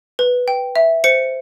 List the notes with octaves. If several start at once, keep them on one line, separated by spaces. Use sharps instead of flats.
B4
G5
E5
C5 C#7